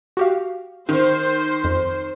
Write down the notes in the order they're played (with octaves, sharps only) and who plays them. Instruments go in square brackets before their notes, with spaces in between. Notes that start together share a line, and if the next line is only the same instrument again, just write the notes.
[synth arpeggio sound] F#4 G4 F5
[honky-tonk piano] D#3 [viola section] C5
[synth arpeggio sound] F2